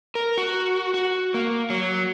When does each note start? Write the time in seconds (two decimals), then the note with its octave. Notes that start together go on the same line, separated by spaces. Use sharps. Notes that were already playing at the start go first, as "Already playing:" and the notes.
0.15 A#4
0.38 F#4
0.94 F#4
1.34 A#3
1.70 F#3